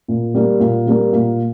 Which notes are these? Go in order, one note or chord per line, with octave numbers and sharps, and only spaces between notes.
A#2
G3 A#3
A#2
G3 A#3
A#2